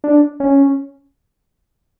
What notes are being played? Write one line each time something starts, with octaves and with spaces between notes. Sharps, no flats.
D4
C#4